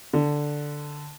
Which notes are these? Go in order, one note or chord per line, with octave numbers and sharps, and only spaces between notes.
D3